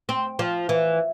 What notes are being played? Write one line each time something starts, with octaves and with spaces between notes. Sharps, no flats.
C4
F3
E3